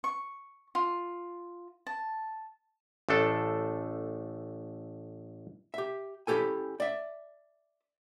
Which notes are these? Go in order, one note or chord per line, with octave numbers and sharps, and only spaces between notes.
C#6
F4
A5
A1 A3 D4 A4
G4 E5
C#4 E4 G4 A4 G#5
D5 E5